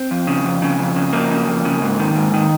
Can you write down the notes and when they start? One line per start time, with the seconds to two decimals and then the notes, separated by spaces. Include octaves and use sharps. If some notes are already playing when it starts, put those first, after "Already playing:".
Already playing: C4
0.11 F2
0.27 C#3
0.44 F2
0.62 C#3
0.79 F2
0.96 C#3
1.13 F2 A#3
1.31 C#3
1.47 F2
1.65 C#3
1.82 G#2
1.99 D#3
2.15 G#2
2.34 D#3